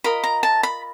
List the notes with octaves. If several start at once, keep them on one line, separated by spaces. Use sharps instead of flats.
F4 A#4 D#5 B5
A#5
A5
B5